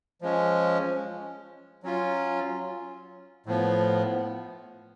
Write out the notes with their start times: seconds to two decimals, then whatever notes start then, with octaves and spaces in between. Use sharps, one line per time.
0.21 F3 G#3 C#4
1.83 F#3 C#4 F4
3.46 A2 F3 B3